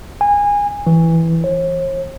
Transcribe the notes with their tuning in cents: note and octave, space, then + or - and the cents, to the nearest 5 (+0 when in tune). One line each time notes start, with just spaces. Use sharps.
G#5 -25
E3 +0
C#5 -45